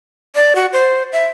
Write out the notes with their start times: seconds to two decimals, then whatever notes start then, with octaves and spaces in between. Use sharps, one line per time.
0.35 D5
0.55 F#4
0.73 C5
1.13 E5